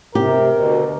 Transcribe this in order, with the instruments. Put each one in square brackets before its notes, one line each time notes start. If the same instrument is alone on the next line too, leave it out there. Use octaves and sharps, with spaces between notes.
[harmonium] C3 [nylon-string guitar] G4 [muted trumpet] A#4
[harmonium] D2 B2